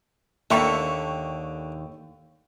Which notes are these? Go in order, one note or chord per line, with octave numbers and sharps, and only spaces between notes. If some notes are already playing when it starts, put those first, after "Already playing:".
D#2 D3 A4 A#4 E5 G5 C#6 C#7